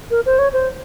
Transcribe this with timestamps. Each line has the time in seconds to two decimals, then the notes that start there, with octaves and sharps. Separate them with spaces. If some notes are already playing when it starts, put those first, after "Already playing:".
0.11 A#4
0.26 C5
0.39 C#5
0.53 C5